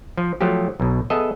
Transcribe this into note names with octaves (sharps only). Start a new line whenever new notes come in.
F3
F3 F#3 A3 G4
B1 B2
B3 G#4 A4 D#5 E5